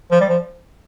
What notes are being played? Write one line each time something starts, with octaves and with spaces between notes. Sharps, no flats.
F3
G3
F3